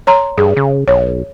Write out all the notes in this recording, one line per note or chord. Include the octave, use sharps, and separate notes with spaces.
C#5 A#5 C6
G2 G#4
C#3
B1 C#5